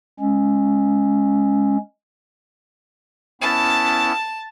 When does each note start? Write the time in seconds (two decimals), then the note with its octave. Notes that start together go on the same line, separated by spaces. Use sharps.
0.20 G#3 C#4
3.41 B3 C#4 E4 A5